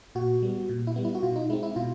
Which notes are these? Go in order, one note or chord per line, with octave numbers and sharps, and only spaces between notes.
A#2 F#4
G3 B3
A#2
E4
G3 B3
E4
F#4
B2 F4
D#4
G#3 C4 E4
E4
B2 F4